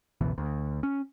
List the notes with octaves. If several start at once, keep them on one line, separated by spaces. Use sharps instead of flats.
G1 C#2 B2 E3
D2
C#4